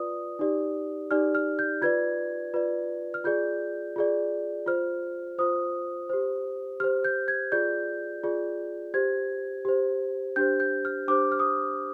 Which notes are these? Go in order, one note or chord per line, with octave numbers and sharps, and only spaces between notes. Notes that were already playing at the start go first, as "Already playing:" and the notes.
Already playing: F4 B4 D5 D#6
D#4 G4 D5
D#4 G4 D5 F6
F6
G6
F4 B4 D5 G#6
F4 B4 D5
F6
F4 G#4 D5 G6
F4 G#4 D5
F4 C5 F6
F4 C5 D#6
G4 C5
G4 C5 F6
G6
G#6
F4 G#4 D5 G6
F4 G#4 D5
G4 C5 G#6
G4 C5
D4 G4 C5 G6
G6
F6
D4 G4 C5 D6
F6
D#6